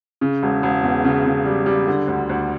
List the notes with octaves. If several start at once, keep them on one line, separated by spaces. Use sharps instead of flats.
C#3
E1
E1
E2
C#3
C#3
G3
G3
D3
D2
D2